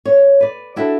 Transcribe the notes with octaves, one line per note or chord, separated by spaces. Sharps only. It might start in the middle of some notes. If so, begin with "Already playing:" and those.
C#5
B4 D5
D4 E4 F#4 A4